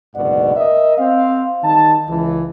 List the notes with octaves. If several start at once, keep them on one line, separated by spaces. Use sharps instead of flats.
F#1 D2 G#2 B2 D5 F#5
A#4 D#5 E5
C4 F5
D#3 G3 D#4 A5
C#2 E3